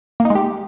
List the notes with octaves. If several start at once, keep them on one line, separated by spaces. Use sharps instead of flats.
A#3
D#4
G#3
G4